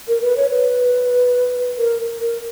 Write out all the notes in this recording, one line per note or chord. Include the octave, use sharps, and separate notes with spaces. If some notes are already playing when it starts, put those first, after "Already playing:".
A#4
B4
C#5
B4
A#4
A#4